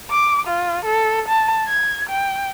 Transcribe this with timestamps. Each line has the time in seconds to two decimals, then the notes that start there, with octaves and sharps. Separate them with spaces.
0.11 D6
0.47 F4
0.85 A4
1.28 A5
1.68 G#6
2.09 G5